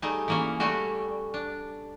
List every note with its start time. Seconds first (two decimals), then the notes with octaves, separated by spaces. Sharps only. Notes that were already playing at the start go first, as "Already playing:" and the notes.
0.02 G3 A3 D#4 G#4
0.28 E3 A#3 C#4
0.60 G3 A3 C#4 F#4
1.34 D4